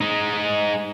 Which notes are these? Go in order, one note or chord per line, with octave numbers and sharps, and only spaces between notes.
G#3 D#4